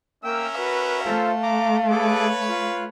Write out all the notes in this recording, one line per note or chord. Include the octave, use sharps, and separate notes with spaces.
A#3 C#4 A#4 E5 G5 E6
F#4 B4
A3 F4 A4 C5 F5
A#5 D6
G#4 A4 B4 C#5 D6
F4